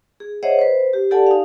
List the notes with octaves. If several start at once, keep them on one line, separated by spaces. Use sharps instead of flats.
G#4
G#4 C5 C#5 D#5 E5 F#5
B4 C5
G4
G4 A4 D5 F#5 G#5 A5
D#4 F5